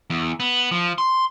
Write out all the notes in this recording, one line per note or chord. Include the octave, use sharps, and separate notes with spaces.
E2
B3
F3
C6